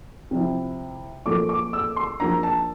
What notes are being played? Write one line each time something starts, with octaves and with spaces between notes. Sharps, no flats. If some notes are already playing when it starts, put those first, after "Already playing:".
C3 F3 C4 E4
A#2 F3 A3 D6
D6
E6
C6
F3 A#3 D4 A#5
A5